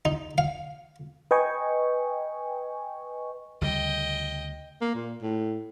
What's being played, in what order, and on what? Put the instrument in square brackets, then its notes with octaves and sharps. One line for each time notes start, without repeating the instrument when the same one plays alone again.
[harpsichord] D#4
F5
[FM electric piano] B4 D#5 G5 G#5 C#6
[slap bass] D2 C#3 G3 [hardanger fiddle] D#5 G5
[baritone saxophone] A#3
A#2
A2